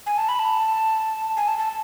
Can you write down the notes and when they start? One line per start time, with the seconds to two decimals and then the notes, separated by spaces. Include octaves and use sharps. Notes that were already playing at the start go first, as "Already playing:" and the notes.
0.06 G#5
0.18 A5
0.29 B5
0.39 A5
1.37 G#5
1.48 A5
1.58 A5